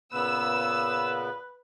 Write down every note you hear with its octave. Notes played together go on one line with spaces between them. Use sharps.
A#2 C#3 B3 B4 E6